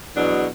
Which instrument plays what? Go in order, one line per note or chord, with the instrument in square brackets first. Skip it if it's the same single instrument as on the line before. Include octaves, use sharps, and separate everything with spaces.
[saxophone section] E2 B2 F#3 B3 D4